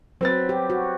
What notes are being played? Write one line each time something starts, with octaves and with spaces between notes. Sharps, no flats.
F#3 C4 B4 A6
G4
F#4